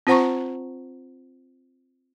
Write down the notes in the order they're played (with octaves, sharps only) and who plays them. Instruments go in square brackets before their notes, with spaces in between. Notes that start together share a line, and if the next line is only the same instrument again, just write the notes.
[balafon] C4 F4 C5 F#5 A#5 C#6